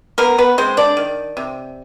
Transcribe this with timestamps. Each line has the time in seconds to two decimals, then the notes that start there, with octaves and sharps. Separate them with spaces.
0.18 A#3 B3 A#4
0.38 B3 B4
0.58 G#3 C4 C5
0.77 D4 D5
0.97 D#3
1.37 C3